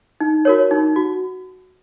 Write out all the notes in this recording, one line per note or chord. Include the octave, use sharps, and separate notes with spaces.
D#4
F#4 A#4 C#5
D#4
F#4